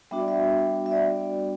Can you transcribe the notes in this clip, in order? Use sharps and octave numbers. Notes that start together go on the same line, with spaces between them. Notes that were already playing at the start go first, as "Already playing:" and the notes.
G3 B3 D4 F#4 E5
D5
E5
E5
D5